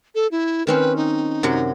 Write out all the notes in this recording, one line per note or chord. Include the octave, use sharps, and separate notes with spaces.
A4
E4
D#3 C4 C#4 B4
D#4
F#2 C3 F#3